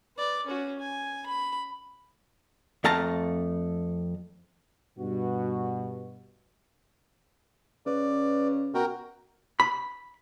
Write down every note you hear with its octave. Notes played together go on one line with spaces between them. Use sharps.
B4 D5
C#4 F#4
G#5
B5
F2 A3 F5 A5 A#5
G2 B2 F#4
C#3 B4 D5
B2 F#4 A#4 G5
B5